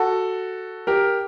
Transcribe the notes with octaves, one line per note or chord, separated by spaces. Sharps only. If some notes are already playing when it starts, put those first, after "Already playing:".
Already playing: F#4 A4
G4 A#4